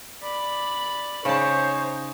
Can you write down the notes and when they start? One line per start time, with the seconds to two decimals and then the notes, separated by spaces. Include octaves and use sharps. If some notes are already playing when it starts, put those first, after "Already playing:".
0.22 D5 B5
1.25 C#3 D#4 C5 C#5 A5